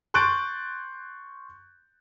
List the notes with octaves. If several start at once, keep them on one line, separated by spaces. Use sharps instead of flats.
C6 C#6 F#6 G6 A6 D7